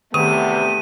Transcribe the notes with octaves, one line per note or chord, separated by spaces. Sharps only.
E2 C3 D#3 A3 B3 G4 C#6 D#7